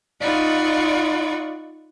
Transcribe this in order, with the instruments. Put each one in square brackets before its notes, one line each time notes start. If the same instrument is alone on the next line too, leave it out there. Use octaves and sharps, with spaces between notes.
[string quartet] D#4 F4 D5 F#5 B5 C#6